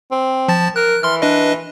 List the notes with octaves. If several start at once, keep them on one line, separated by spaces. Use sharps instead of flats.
C4
F3 A5 A6
A#4 F#6
E3 C6 F6
D4 B4 D#5